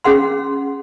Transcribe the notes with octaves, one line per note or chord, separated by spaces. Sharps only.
C#4 G#4 F#5 C6